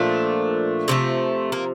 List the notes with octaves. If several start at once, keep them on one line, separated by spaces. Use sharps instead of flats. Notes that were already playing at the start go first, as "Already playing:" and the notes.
Already playing: A#2 F3 A3 D4
C3 F3 A3
A#3